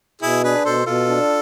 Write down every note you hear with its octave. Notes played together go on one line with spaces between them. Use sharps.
B2 E4 G#4
D4 G#4 B4
B2 A4 C5
B2 F4 A4
D4